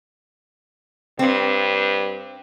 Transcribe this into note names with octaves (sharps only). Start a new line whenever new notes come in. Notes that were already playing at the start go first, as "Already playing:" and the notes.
G2 C4